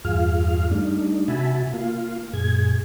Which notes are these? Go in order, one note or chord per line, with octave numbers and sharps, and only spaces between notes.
E2 G2 F4 G#4 F5 F6
G3 A3 D4 D#4
C3 F#4 E5 G#5 A5 B5
A#3 F4 F5
F#2 A#2 G#4 G#6